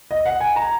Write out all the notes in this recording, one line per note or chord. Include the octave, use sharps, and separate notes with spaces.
D#5
F#5
G#5
A#5